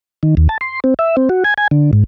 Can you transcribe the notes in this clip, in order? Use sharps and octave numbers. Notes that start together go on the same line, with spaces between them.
D#3
D#2
A5
C6
C4
E5
C4
F#4
G#5
G#5
D3
G#2